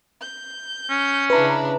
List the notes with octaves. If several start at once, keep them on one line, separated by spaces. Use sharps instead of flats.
G6
C#4
C#3 D4 E4 B4 A#5